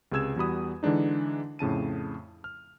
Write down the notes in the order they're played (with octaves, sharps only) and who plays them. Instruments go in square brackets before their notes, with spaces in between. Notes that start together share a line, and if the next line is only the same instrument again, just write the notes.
[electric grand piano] C#2 C3 G#4 E6 G#6 E7
E2 G3 F#4 B5 D#6
D3 E3 G#3 D4 D#4
F2 A2 C#3 A5 D#7
F6